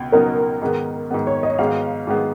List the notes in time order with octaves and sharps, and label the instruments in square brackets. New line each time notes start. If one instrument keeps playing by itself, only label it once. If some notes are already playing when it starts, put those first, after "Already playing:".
Already playing: [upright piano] C#2 B2 B3
[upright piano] C#2 B2 F#3 B3 D#4 [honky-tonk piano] A#4
[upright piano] G#2 D#3 G#3 B3
G#2 D#3 G#3 B3
[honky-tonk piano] C#5
D#5
[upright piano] G#2 D#3 G#3 B3 [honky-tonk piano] F5
[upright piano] G#2 D#3 G#3 B3